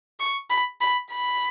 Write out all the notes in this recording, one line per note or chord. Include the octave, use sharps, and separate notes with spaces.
C#6
B5
B5
B5